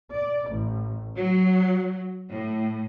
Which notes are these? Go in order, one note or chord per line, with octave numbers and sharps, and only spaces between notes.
D5
A1
F#3
A2